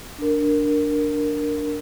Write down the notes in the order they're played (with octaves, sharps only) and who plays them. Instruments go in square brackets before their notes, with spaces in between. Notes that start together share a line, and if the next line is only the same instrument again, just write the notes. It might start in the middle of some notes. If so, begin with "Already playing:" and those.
[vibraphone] D4 A#4